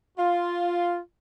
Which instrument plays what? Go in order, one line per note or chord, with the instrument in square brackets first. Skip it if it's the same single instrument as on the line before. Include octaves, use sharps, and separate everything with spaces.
[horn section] F4